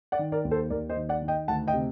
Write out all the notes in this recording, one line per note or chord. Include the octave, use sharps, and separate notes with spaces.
D5 F#5
D#3
A#4 D5
D#2
A4 C5
D#2 A#4 D5
C5 D#5
D#3
D5 F#5
D#3
D#5 G5
D2 F#5 A5
D#5 G5
C3